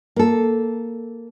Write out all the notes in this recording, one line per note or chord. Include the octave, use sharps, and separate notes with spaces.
A#3 A4